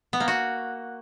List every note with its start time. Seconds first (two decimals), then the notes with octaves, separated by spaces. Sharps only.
0.13 B3
0.20 A#3
0.28 F#4